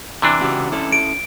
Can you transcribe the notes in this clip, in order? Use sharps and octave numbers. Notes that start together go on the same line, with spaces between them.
C3 E3 D4
C#3 F#4 G4
C#4 E4 A4
D7